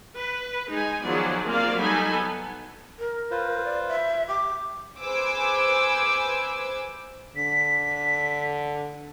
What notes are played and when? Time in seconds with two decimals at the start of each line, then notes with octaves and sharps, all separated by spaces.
0.16 B4
0.71 G#3 D#4 G#5
1.05 D#3 F3 F#3 B3 G#4 D5
1.47 A#3 C4 F4 G#4 D5 F5
1.79 F#3 G3 D#4 A4 G#5 B5
2.14 B3
2.99 A#4
3.31 F4 B4 C5
3.65 D5
3.88 E5
4.28 G4 D6
5.02 G#4 B4 C5 G#5 D6 E6
7.36 D3 B6